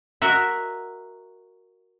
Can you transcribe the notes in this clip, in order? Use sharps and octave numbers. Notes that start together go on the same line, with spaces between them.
F#4 A#4 D#5 E5